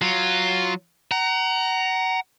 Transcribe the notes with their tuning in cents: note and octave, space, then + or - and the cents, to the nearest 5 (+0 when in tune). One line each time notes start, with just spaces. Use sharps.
F#3 +0 F4 +0
F#5 +30 A#5 +0